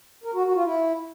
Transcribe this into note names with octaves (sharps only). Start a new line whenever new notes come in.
A#4
F#4
F#4
F4
E4